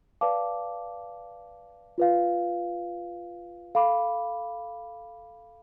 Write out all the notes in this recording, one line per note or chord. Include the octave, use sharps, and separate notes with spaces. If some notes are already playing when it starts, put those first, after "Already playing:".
B4 D5 F5 A5 D6
F4 B4 F5
A4 F5 B5 D6